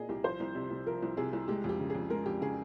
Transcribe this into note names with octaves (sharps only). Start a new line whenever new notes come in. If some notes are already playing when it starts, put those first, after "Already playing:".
Already playing: A#2 A#3 G#4 D#5
C2 G4
F3 C5
C2
C3
C2
F3 A#4
C2
C3 G#4
C2
G#3 G4
F2 G4
C#3
F2 G#4
G#3 A#4
F2 G4
C#3 G#4